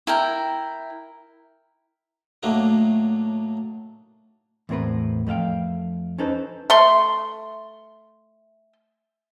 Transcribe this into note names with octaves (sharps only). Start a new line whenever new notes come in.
E4 A#4 G5
A2 F#3 A3 A#3 D4 D#4
E2 A2 C4 A#4 B4
F2 A3 D4 F5 G5
C#4 D#4 A4 B4 C5
A3 C6